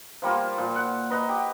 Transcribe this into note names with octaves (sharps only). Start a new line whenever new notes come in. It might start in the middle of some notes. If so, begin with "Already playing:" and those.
F3 G3 A#3 F4
A#2 F3
F#5
B4 D#5 A#5
G4